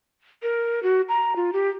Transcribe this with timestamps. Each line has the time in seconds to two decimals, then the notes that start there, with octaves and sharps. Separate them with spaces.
0.43 A#4
0.83 F#4
1.09 A#5
1.36 F4
1.53 G4